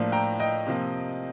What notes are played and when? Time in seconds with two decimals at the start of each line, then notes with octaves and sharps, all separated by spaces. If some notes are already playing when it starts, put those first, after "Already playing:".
Already playing: A2 F3 A#3 D4
0.12 G5 A#5
0.40 D#5 G5
0.67 C3 F3 A#3